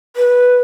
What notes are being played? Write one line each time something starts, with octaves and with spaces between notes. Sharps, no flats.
B4